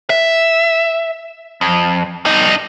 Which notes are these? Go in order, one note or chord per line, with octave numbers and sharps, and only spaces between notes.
E5
F2
G2 D#4